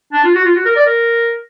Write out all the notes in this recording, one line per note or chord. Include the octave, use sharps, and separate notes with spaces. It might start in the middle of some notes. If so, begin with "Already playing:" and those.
D4
F4
F#4
F4
F#4
A#4
D5
A#4